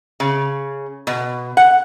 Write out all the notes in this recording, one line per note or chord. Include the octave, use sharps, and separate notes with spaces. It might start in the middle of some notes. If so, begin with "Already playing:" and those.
C#3
B2
F#5